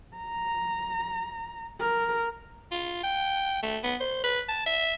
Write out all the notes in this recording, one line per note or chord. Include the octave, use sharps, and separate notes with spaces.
A#5
A#4
F4
G5
A3
B3
C5
B4
A5
E5